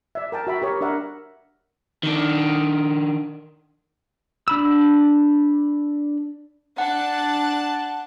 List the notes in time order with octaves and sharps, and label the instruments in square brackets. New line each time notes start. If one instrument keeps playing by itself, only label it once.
[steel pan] D5 E5
A#4 G5 A5
F#4 E5 B5
G4 A#4 C#5
D4 A#4 D5 E5 F#5
[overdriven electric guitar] D#3 D4
[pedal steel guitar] D4 B5 E6
[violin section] D4 A5 F#6 [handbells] F#5